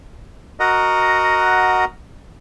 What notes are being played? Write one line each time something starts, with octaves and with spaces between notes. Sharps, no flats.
F#4 A#4 D#5 F#5 A#5